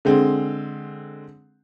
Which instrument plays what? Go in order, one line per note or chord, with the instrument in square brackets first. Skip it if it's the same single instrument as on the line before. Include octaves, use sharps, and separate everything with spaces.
[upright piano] D3 G#3 C4